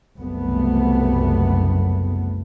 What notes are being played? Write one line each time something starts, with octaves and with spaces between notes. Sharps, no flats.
F#1 C2 F#2 A3 B3